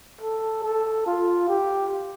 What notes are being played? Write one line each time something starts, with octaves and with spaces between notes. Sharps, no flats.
A4
A4
F4
G4